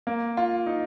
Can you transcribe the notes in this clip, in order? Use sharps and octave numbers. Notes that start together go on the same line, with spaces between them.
A#3
F4
D#4